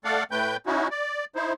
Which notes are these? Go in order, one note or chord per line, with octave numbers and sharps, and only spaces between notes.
A3 A4 D5 F5 F#5
A2 A3 B4 G5 G6
C#4 D#4 E4 F#4
D5
D#4 E4 C5